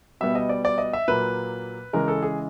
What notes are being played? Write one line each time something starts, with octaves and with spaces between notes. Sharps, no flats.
B2 G3 B3 E5
D#5
D5
D5
D#5
E5
A#2 F#3 A#3 B4
C#3 E3 G#3 A#4
A4
G#4